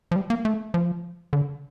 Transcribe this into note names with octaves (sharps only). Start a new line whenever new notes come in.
F3
G3
A#3
A3
F3
D3